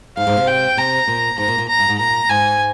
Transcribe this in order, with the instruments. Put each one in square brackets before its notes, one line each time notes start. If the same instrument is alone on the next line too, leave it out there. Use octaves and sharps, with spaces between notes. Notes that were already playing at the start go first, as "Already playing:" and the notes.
[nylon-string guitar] G#2 [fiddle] F5
[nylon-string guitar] G#2
C3
[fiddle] G5
[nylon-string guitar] C3 [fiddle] A#5
[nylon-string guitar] A#2
[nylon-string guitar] G#2 [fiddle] A#5
[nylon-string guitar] A#2
A#2
[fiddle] A#5
[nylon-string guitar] G2
G#2
[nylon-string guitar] A#2 [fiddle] A#5
[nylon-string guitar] G#2 [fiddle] G#5